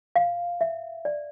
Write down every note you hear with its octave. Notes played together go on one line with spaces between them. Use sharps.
F5
E5
D5